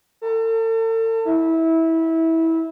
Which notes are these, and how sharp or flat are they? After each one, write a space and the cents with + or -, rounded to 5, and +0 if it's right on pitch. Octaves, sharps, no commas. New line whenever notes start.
A4 +40
E4 -20